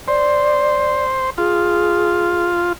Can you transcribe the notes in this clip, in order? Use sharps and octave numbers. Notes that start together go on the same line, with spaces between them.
C5 D5
F4 G#4